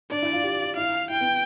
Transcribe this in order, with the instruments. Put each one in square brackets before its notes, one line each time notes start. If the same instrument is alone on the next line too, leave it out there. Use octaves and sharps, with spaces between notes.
[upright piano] D4 [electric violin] D5
[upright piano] E4
F4
G4
F4
[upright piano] E4 [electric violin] F5
[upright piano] E4 [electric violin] G5
[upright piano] B3